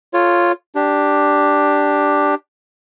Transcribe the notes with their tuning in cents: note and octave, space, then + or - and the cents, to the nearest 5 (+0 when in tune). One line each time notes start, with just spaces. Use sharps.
F4 +0 A4 +0 C#5 +0
D4 +0 G4 +0